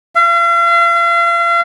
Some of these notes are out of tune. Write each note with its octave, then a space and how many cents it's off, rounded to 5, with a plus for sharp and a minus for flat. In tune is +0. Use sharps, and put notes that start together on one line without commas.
F5 -40